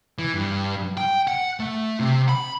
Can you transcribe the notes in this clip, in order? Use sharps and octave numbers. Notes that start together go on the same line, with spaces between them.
E3
G2
G5
F#5
A3
C3
B5